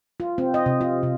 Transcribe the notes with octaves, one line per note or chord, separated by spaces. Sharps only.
F4
C4
D#5
C3
F4
C3